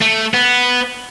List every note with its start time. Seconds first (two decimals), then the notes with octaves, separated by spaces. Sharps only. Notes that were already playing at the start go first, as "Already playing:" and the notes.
0.01 A3
0.34 B3